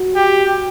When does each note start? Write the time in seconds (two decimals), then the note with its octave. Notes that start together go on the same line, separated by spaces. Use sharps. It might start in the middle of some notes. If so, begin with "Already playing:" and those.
Already playing: F#4
0.15 G4